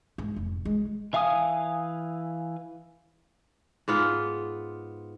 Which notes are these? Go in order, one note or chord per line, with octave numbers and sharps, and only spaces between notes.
G#2
F1
G#3
E3 E5 F5 G#5 D#6
G#2 B3 F4